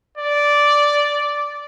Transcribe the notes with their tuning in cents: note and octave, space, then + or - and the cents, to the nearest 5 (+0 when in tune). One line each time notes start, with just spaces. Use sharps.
D5 -5